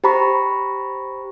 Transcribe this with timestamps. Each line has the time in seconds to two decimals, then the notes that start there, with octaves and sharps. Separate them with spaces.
0.04 G4 C5 A#5 B5 C#6